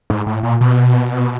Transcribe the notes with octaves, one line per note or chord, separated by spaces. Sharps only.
G#2
A2
A#2
B2